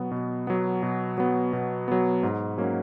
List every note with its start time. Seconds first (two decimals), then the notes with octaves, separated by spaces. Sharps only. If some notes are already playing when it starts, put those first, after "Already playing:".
Already playing: B2 F#3 B3
0.12 B2
0.47 F#3 B3
0.83 B2
1.18 F#3 B3
1.53 B2
1.88 F#3 B3
2.23 G#2
2.58 F#3 A#3 C#4